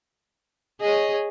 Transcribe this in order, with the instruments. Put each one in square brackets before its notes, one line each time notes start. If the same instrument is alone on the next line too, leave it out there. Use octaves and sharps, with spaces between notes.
[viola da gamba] G#4 [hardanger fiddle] C#5 D#5